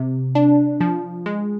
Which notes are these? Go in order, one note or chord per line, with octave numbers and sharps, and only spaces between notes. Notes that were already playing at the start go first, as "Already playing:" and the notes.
Already playing: C3
D4
F3
G#3